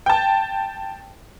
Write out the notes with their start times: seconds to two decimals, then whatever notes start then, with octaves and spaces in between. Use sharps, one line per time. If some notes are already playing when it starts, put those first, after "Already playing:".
0.06 G5 A5